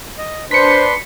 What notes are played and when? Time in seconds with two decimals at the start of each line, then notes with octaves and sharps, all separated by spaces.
0.18 D#5
0.51 D4 B4 C5 C6 B6 C#7